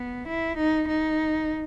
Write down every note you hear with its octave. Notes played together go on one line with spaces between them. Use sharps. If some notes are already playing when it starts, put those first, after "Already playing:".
Already playing: B3
E4
D#4
D#4